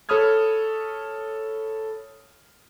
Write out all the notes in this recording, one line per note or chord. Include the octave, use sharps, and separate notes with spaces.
A4 C#5 B5 D#6 F6 G#6